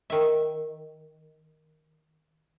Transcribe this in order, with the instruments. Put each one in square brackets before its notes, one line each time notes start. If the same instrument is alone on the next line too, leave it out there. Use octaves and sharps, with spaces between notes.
[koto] D#3 E5